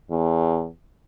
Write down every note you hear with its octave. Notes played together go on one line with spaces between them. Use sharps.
E2